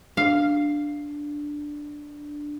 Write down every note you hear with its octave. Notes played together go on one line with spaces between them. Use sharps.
D4 F5